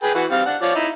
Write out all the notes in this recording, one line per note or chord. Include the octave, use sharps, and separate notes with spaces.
G#4 B4 G5
E3 F#4 B4
G3 C4 F5
D4 F#5
F3 C#5 D5
D#4 E4